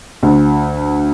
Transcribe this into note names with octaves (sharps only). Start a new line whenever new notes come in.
D2